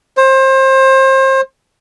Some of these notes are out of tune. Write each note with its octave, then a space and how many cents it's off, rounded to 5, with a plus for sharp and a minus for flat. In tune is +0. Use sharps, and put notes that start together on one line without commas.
C5 +30